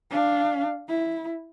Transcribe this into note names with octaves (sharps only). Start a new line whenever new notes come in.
D4 F5
E4